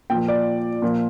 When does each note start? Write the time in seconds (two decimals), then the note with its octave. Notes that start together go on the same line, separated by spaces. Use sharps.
0.10 A#2 F3 G5
0.28 D5
0.82 A#2 F3